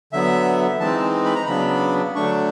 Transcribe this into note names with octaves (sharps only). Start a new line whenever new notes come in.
D3 F#3 B3 E5
E3 G#3 C4 D#4 A5
B5
A#5
C#3 F#3 B3 D4 B5
D3 F#3 A3 D4 C#6